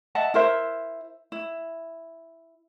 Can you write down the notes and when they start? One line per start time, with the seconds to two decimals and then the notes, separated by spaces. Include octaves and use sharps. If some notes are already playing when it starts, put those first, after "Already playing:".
0.15 D#5 E5 F#5 A5
0.34 E4 A#4 C5 E5
1.32 E4